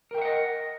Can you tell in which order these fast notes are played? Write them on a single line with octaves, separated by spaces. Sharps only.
A#4 G5 E5 F#5 D#5